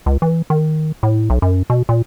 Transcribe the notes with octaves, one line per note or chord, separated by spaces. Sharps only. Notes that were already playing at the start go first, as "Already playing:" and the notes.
C#2
E3
D#3
A2
B1
F#2
B2
A#2